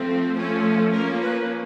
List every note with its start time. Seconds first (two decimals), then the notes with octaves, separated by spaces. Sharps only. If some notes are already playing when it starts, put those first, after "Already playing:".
Already playing: F3 A3 C4
0.34 F3 A3 C#4
0.93 F3 A#3 C#4 A#4
1.22 B4